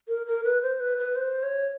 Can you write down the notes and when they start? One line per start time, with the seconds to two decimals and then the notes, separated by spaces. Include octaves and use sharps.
0.08 A#4
0.26 A#4
0.44 B4
0.62 C5
0.80 B4
0.98 B4
1.16 C5
1.43 C#5